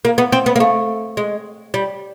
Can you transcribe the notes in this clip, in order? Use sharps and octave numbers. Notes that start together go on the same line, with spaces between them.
A#3
B3
C4
B3
A#3
A3
G#3
G3